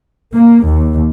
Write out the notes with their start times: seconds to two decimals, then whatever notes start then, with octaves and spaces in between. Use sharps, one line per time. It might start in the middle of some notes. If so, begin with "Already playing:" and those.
0.34 A#3
0.64 D#2